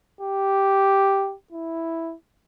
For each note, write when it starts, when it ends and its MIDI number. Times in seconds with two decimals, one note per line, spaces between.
0.21 1.35 67
1.52 2.15 64